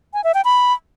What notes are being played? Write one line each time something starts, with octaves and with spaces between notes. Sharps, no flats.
G#5
E5
G5
B5